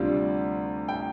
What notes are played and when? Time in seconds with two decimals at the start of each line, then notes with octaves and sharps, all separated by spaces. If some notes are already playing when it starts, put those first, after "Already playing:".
Already playing: D2 C3 G3 D4 F4
0.89 G5